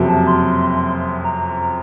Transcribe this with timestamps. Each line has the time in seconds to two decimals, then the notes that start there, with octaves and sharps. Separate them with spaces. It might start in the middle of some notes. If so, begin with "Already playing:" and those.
Already playing: F#1 F2 C3 F#3
0.08 A5
0.27 C6
1.24 A#5